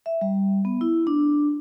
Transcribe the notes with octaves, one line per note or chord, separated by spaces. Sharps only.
E5
G3
B3
E4
D4